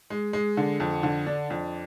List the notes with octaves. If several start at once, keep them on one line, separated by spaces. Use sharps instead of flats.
G#3
G#3
D3
F2
D3
D4
F2